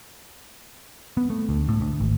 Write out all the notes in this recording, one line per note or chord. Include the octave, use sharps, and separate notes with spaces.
B3
A3
D2
A2
D2
G#1